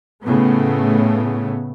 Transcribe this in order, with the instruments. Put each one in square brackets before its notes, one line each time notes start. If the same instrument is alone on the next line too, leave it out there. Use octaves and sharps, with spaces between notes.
[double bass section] A2 C#3 A3 B3